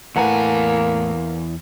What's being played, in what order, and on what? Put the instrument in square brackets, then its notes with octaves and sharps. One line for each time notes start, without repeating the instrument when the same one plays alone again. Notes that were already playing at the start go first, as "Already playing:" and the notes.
[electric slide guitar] E2 G#5 [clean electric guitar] A2 [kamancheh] A#3 [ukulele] B4 F#5 A#5